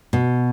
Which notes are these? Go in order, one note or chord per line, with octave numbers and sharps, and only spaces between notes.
B2